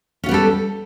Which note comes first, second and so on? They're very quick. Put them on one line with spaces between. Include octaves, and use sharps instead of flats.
C#4 F4 B3 G3 A4